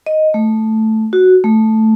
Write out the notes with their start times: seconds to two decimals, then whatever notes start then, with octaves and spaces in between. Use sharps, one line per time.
0.07 D#5
0.34 A3
1.13 F#4
1.44 A3